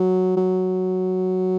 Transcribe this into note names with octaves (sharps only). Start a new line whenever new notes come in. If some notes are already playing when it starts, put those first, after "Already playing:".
Already playing: F#3
F#3